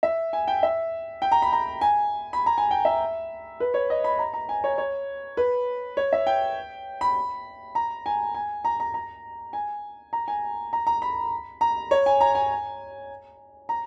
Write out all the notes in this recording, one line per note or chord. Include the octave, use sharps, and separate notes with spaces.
E5
G#5
G5
E5
G5
A#5
B5
A#5
G#5
B5
A#5
G#5
G5
E5
B4
C#5
D#5
B5
A#5
A#5
G#5
C#5
C#5
B4
C#5
E5
G5
B5
A#5
G#5
G#5
A#5
A#5
A#5
G#5
A#5
G#5
A#5
A#5
B5
A#5
C#5
G#5
A#5
G#5
A#5